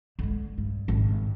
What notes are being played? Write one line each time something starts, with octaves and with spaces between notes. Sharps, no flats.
D3 G#3
G2
G#1